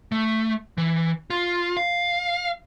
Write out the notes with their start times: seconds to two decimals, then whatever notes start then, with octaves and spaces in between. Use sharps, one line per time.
0.12 A3
0.78 E3
1.30 F4
1.77 F5